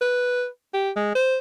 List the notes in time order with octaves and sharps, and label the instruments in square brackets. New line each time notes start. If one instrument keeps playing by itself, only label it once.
[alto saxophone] B4
G4
G#3
C5